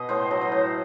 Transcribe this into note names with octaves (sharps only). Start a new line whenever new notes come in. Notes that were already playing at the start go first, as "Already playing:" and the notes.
Already playing: B2 D#5
A2 C5
F#3 D#5
C5
A2